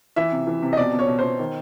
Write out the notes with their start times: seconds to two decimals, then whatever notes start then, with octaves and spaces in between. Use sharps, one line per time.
0.16 E3 E5
0.32 C3
0.47 E3
0.63 C3
0.73 D#5
0.77 B2 D5
0.93 B2
0.99 C#5
1.08 B2
1.19 B2 C5
1.39 D#3